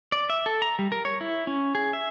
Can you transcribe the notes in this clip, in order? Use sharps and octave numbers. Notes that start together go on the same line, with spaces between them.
D5
E5
A4
A#5
G3
A#4
C#5
E4
C#4
G#4
E5